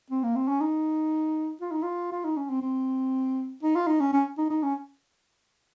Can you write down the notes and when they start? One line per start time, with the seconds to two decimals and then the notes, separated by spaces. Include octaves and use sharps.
0.10 C4
0.23 A#3
0.36 C4
0.48 C#4
0.61 D#4
1.61 F4
1.72 D#4
1.83 F4
2.12 F4
2.24 D#4
2.37 C#4
2.50 C4
2.62 C4
3.63 D#4
3.76 F4
3.87 D#4
4.00 C#4
4.13 C#4
4.38 D#4
4.50 D#4
4.63 C#4